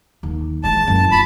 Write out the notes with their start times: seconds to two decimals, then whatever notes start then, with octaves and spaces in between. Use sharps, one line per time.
0.23 D#2
0.64 E3 G#3 A5
0.87 F#2 E3
1.12 G#1 F4 A5 B5